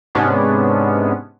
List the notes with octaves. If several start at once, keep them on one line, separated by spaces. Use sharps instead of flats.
G#2 C3 G#3 B3 C#4 D4